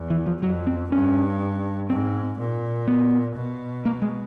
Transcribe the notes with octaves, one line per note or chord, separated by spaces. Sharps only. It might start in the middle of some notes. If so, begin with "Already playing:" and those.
Already playing: E2
E3
F3
F2 F#3
C4
G2 C#4
G#2 C4
A#2
B3
B2
A#3
G#3